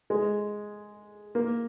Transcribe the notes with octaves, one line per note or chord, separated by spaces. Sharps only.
G#3
A#3